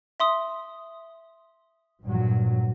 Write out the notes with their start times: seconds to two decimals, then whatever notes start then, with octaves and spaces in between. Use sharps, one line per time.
0.20 E5 C6 D#6
2.04 G2 A#2 F#3